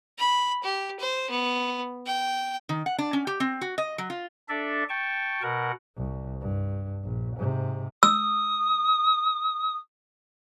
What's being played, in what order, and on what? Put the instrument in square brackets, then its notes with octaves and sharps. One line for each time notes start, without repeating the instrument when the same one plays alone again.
[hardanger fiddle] B5
G4
C5
B3
G5
[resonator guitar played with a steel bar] D#3
F#5
D4
C#4
G4
C4
F#4
D#5
F#3
F4
[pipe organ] D4 A4 D5 E5
G5 A5 C#6
B2 A#4 F#5
[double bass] C2
G2
A#1
G#2 C3
[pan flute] D#6 [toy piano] E6